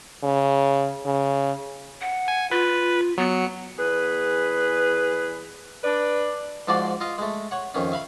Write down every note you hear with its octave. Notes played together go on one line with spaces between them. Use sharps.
C#3
C#3
F#5
G#5
F4 B4
F#3 B3 C#7
E2 G#4 B4
D4 B4 D5
G#2 F3 D4 F#4 D5 C6
F4 D#5 F5
G#3 A3
C#5 F#5
F2 D#3 C#4
E5 F5 B5